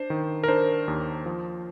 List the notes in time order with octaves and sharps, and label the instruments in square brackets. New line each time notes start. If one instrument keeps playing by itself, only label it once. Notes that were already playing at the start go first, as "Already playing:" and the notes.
Already playing: [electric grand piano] D4 C5
D#3
A#4
D4 C5
D#2
F3